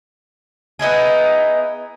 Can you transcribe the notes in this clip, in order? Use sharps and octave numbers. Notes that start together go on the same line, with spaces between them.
B3 D#4 E4 G#4